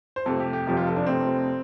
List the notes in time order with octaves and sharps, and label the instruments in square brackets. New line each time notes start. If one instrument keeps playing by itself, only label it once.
[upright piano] C5
F2 C3 A3 A4
G4
G4
F1 F2 F3 G4
F4
A4
D4
F1 F2 C3 A3 C4